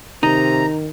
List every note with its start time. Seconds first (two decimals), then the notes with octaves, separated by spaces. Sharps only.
0.23 C3 D#3 D#4 A#5